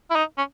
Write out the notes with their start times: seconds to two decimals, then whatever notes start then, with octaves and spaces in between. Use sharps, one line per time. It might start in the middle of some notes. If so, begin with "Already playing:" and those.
0.11 E4
0.16 D#4
0.38 C#4